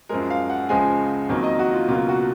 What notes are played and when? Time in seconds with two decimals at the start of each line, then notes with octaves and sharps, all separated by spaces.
0.09 F#2 F3 G#3 A#4
0.30 F5
0.50 F#5
0.69 C#2 C#3 F3 G#3 G#5
1.29 F2 D#3 F#3 A#3
1.44 D#5
1.59 F#4
1.73 F4
1.88 C#2 B2 F#3 A#3 F4
2.09 F#4